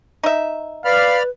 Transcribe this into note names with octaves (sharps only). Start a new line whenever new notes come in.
D#4 E5
B4 D5 F5 B5 F6